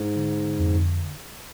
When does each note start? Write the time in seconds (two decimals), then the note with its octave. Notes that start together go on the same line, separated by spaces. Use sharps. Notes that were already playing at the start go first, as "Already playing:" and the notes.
Already playing: G#2
0.16 D3
0.59 F2